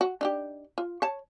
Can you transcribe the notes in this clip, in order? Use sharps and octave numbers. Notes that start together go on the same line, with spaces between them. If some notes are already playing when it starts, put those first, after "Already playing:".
F#4
D4 D#4 G4
F4
C#5 A5